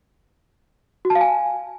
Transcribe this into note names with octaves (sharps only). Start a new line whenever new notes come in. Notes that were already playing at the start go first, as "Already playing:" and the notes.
F#4
A5
F5
G#5